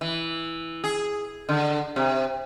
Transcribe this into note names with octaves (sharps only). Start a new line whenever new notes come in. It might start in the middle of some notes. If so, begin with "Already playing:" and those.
E3
G#4
D3
C3